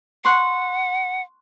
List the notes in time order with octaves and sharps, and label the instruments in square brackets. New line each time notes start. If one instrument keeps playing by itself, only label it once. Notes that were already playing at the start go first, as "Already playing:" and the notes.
[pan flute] F#5 [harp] C6 C#6 F#6